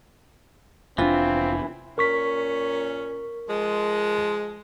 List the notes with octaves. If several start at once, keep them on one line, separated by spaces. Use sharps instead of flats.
F1 E3 C4 D4 F4
A#2 C#4 A#4 C#6 B6
F3 G#3